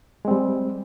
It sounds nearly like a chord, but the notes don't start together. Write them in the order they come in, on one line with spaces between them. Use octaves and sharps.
G#3 C4 G3